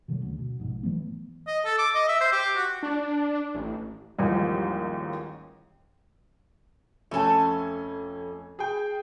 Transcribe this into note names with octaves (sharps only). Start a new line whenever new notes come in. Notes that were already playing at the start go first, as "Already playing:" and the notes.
B2 D3 D#3 F#3
D2 C#3
B2
A#1 G#2 B2
E3 F#3 A3 B3
D#5
A4
D6
D#5
E5
C5
G4
F#4
D4
A1
A1 D#2 G#2 E3 F3 G3
F2 A3 C#4 A4 G#5
G#4 G5